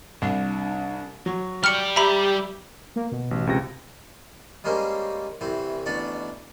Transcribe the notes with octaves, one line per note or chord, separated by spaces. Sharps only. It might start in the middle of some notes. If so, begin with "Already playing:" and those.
C2 D4
F#3 C#6
G3 D5 F6 C#7
G4 E5 A#5 B5
A#3
B2
A1
C#2 C3 A#6
G3 G#3 A#3 C#4 C5
C2 E3 C4
A1 B2 D4 D5 F#5